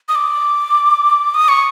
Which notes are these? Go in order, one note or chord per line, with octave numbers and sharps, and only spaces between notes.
D#6
D6
D#6
C#6